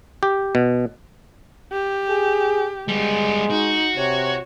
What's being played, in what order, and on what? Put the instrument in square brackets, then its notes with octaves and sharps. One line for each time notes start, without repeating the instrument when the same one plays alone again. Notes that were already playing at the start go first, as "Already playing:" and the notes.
[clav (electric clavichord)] G4
B2
[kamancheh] G4
[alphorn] G#4
[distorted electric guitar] G3 B3 [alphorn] G#3
[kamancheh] D#4 [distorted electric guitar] F#4
[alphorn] C3 [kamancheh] C#5